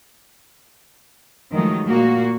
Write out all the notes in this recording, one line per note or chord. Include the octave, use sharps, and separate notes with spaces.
D#3 F3 F#3 G#3 A3 D#4
A#2 A#3 F#4